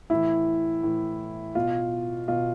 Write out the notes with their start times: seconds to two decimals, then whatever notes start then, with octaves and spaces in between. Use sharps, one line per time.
0.10 A2 E3 E4
0.83 A2 E3
1.55 B2 F4
2.27 B2 F4